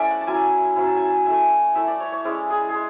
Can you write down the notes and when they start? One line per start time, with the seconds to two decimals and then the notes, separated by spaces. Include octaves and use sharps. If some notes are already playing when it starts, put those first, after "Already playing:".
Already playing: A3 C#4 E4 D5 E5 G#5
0.10 F#5
0.21 A5
0.27 F#3 C#4 E4 G#5
0.76 F#3 C#4 E4
0.86 A5
0.96 G#5
1.06 A5
1.26 A3 E4 G#5
1.75 A3 E4 E5
1.88 D5
2.00 C#5
2.12 C#5
2.24 G#3 C#4 E4 D5
2.50 G#4
2.69 G#4
2.74 G#3